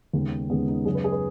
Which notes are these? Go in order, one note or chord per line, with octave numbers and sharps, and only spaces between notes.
D#2 C#3 G#3 B3
D#2 C#3 G#3 B3 C#4
D#4
F#2 C#3 F#3 C#4 G#4
B4
G#4
B4